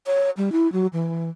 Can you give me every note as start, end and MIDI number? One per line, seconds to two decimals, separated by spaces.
0.06 0.30 73
0.37 0.52 55
0.52 0.70 64
0.72 0.87 54
0.93 1.30 52